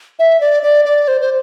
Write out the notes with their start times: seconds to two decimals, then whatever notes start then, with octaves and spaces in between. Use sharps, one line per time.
0.19 E5
0.41 D5
0.63 D5
0.85 D5
1.08 C5
1.21 C5